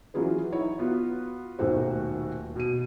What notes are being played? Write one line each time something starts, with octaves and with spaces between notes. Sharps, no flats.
E3 F#3 C#4 F4 G#4 B4
D#4 E4 C#5
B3 F4 F#4
D#1 B2 D#3 A3 F#4 C5
B2 D#7